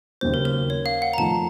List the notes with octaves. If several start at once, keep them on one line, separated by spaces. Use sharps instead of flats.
D#2 C#3 F#3 A#3 C5
A#4
A#4
C#5
F5
F#5
A#5
F2 D#3 A3 A5